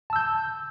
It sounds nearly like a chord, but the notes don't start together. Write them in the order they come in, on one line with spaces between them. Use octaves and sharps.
A5 E6 G6